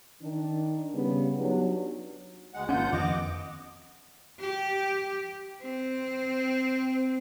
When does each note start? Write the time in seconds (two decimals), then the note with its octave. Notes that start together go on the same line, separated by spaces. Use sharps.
0.23 D#3 D4
0.94 C#3 G3 B3
1.37 F#3 B3 D4 D#4 G4
2.54 D2 G#3 F#5
2.69 G#1 G2 A#3 C#4 F4 F#5 G6
2.93 F2 D#3 F3 C4 D#5 D6
4.40 G4
5.62 C4